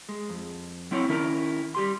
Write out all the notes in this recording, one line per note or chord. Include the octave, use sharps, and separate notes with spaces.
G#3
F2
F#3 C4 E4 C#5
D#3 C#4 E4 A#4
G3 G4 C6